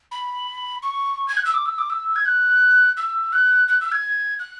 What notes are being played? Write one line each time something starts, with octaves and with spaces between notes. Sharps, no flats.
B5
C#6
G#6
F#6
E6
D6
E6
D6
E6
G#6
F#6
E6
F#6
F#6
E6
G#6
F#6